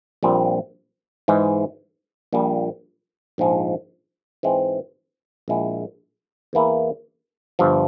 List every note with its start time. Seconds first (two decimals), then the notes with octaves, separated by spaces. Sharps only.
0.23 A#1 A#2 G3 C4
1.28 G#2 E3 G#3
2.33 A#1 A#2 G3
3.38 A#1 G#2 F3 G#3
4.43 G#2 E3 G#3 C4
5.48 A#1 A#2 G#3 E4
6.53 E2 E3 A#3 E4
7.59 G1 G2 F3